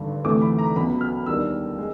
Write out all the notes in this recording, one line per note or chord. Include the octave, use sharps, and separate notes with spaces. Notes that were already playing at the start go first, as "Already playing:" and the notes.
Already playing: G#1 G2 D3
D2 C3 E3 A3 D6
B5
A#5
C#2 B2 F#3 B3 B5
F6
D#2 D#3 G3 B3 D4 E6
G#3